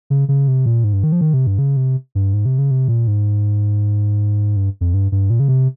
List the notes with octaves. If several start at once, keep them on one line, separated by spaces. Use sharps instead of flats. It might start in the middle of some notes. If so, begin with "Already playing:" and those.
C#3
C#3
C3
A#2
G#2
G2
D#3
F3
D#3
C3
G2
C#3
C3
G2
G#2
C3
C#3
C3
A#2
G#2
G2
F2
G2
G2
A#2
C#3
C3